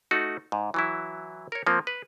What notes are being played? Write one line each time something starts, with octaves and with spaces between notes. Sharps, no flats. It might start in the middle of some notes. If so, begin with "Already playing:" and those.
A3 D#4 F#4
G#2
E3 F#3 E4
A#4 C#5
F3 A#3 C4
B4